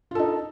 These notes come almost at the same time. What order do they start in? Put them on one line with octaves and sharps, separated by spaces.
F4 A4 D#4